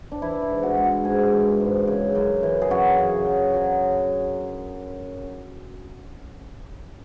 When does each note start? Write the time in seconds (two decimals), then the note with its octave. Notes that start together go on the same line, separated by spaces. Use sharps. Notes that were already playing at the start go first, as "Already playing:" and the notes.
0.12 D4
0.22 E3 E4
0.42 E4
0.50 G#2
0.63 F#4
0.77 G#3
0.85 F#4
1.05 G#2 G#4
1.33 E3
1.60 G#2
1.88 C#3
2.15 F#2
2.43 E3
2.62 G#4
2.71 F#2 F#4
2.98 C#3
3.26 F#2
3.54 F#3